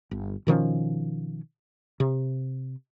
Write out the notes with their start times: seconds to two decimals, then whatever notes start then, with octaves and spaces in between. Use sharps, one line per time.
0.11 G1
0.47 B2 D#3 F3 C#4
2.00 C3